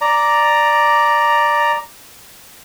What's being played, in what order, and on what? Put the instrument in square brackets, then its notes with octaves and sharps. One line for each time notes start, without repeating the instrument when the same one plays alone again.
[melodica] D5 A#5